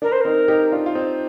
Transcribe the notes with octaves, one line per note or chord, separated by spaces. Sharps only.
D4 A#4
C5
C4 D#4 A#4
D#4 G4
D4 F4
F4
C4 D#4